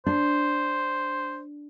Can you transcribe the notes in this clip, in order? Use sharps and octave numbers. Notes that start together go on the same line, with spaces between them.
D4 C5